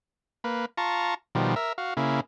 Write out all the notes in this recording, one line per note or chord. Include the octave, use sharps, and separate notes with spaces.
A#3 B4
F4 A5 A#5 C#6
B2 D#3 F3 G3
A#4 E5
F#4 F5
C#3 A#3 E4